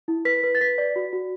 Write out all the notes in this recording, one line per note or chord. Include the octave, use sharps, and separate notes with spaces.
E4
B4 B6
B4
A6
B4 B6
D5
F#4
F#4